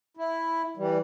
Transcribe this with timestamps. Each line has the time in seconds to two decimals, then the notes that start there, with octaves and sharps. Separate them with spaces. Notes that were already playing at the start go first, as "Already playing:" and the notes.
0.17 E4
0.77 E3 G3